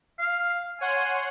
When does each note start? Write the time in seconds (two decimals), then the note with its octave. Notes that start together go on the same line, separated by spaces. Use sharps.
0.19 F5
0.81 C#5 F#5 G#5 C6